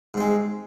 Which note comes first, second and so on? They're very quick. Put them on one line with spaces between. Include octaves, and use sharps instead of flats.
G#2 C4 G#3